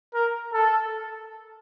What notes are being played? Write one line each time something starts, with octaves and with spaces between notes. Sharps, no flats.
A#4
A4